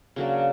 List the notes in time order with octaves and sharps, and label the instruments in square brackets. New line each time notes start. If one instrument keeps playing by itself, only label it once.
[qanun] C#3 F#3 A#3 D4